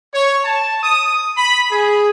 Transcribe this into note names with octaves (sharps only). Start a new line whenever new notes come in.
C#5
A5
D#6
B5
G#4